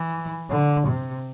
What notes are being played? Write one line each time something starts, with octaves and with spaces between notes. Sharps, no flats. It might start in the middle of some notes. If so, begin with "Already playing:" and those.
Already playing: E3
D3
C3